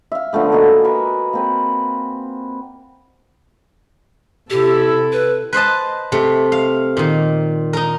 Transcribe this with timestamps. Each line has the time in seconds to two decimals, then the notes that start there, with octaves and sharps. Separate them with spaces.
0.12 E5 F5
0.33 D3 F3 A3 B3
0.52 A#3 F#4 D#5 G#5
0.84 A#4 B4 C#6
1.33 A#3 C4 B4
4.50 C3 E4 G4 A4
5.12 B4
5.53 B4 C5 D#5 A5
6.12 C3 A3 C4
6.52 F5
6.97 A#2 D#3
7.73 D#4 A#4